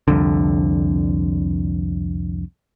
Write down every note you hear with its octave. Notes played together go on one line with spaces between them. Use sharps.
C2 F2 D3